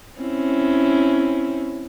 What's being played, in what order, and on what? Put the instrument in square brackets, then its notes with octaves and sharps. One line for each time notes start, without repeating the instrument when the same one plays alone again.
[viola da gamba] C4 C#4 E4